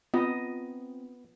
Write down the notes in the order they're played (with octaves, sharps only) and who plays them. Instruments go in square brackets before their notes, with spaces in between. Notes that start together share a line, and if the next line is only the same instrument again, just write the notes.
[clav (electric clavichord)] B3 [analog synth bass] C4 [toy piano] F4 [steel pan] D#5